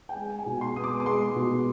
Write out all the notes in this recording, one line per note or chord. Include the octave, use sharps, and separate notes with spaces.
G5
G#3 G#5
G#5
B2
C6
B3 D#6
D6
D6
G#3 C6
B2